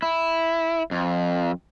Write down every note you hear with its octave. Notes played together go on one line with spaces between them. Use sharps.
E4
F2